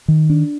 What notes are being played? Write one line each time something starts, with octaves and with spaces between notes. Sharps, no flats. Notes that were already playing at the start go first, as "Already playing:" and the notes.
D#3
D4